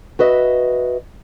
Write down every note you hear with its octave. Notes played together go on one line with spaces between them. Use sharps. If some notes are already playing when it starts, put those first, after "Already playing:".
F#4 B4 D#5 E5